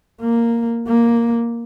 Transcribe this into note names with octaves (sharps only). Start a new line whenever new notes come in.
A#3
A#3